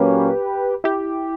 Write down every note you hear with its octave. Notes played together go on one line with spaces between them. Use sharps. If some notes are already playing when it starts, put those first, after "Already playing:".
Already playing: A#2 F#3 A#3 C#4 G4 B4
E4 G4